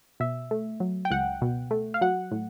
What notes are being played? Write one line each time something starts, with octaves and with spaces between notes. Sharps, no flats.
B2 E5
A3
F#3
G5
C#2 F#5
B2
A3
F5
F#3 F#5
A2